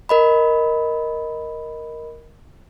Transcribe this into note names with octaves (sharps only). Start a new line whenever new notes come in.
A#4 D#5 B5